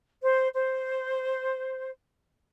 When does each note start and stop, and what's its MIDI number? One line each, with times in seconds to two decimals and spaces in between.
0.22 0.46 72
0.53 1.89 72